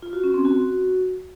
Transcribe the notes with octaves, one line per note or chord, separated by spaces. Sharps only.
F4
F#4
C#4
C4
F#4